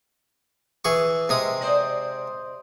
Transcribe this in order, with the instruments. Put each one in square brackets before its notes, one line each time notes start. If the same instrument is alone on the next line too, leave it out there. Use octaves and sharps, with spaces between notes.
[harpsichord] E3 G#4 C#6
C3 G#3 D#6
[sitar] C5 D5 D#5